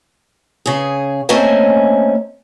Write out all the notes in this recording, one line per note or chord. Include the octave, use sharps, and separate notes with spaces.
C#3 G#4
A3 A#3 C4 C#4 D#5 G#5